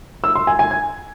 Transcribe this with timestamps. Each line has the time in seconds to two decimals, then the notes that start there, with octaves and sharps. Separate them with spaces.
0.24 E6
0.35 C6
0.47 G#5
0.59 G#5
0.71 G#6